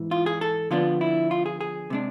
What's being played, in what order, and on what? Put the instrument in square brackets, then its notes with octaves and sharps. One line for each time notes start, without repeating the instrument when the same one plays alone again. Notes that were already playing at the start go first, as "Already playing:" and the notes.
Already playing: [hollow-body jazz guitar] G#2 E3
F4
G#4
A4
D3 F3 B3 D4 F4
E4
F4
G#4
G#4
C3 G#3 D4